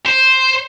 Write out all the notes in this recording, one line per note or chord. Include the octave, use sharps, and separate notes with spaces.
C5